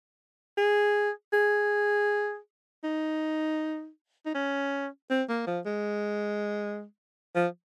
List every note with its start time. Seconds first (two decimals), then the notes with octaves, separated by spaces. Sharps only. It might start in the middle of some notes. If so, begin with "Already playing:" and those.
0.58 G#4
1.33 G#4
2.84 D#4
4.26 D#4
4.35 C#4
5.10 C4
5.29 A#3
5.47 F3
5.66 G#3
7.36 F3